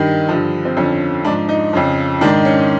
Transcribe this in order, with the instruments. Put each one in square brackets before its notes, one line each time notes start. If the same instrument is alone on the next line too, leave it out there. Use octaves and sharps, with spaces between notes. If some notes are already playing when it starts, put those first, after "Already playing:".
Already playing: [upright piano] G2 D#3
G2 D3 F3
C4
F2 D3 F3 C#4
G#2 F3 D4
D#4
F2 C#3 F3
G#2 D#3 D4
C#4